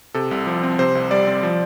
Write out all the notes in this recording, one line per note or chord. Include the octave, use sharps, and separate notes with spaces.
C3 A4
C2
F3
C4
C3 C5
C2
G3 D5
C4
F3